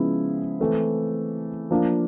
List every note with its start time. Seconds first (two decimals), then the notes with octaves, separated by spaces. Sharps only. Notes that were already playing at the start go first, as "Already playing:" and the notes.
Already playing: C#3 F3 G#3 B3 E4
0.60 E3 A3 C4
1.71 F3 A#3 D4